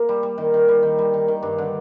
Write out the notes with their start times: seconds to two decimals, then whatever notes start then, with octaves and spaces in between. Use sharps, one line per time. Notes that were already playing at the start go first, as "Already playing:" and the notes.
Already playing: A#3
0.09 G3
0.23 G3
0.38 D#3
0.54 D#3
0.68 G3
0.83 D#3
0.98 G3
1.14 D#3
1.28 D#3
1.43 G2
1.58 D3